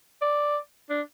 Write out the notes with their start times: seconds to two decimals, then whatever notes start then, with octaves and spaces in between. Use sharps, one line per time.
0.22 D5
0.90 D4